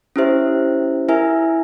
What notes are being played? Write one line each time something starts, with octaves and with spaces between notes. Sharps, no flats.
C#4 E4 G4 C5 E5
E4 A#4 E5 G#5